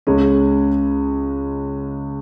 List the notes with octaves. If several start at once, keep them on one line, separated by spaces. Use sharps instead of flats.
C#2 C#3 G#3 C#4